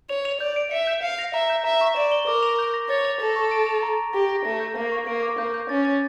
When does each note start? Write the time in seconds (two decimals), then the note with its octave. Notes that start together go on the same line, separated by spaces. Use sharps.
0.09 C#5 F7
0.25 F7
0.40 D5 G6
0.56 D7
0.71 E5 C#7
0.87 G6
1.03 F5 C#7
1.19 A#6
1.34 E5 A#5
1.50 G6
1.64 E5 A#5
1.81 C#6
1.96 D5 E7
2.12 G7
2.27 A#4 D6
2.43 F7
2.59 G6
2.74 A#6
2.89 C#5 A6
3.05 F7
3.20 A4 A#6
3.36 C#6
3.51 D7
3.67 F7
3.83 A#5
3.99 A#5
4.13 G4 A#6
4.29 A#6
4.45 A3 A#6
4.60 G6
4.76 A#3 A#6
4.92 C#6
5.07 A#3 D7
5.22 D6
5.38 A#3 G6
5.54 G6
5.69 C#4 A6
5.85 A6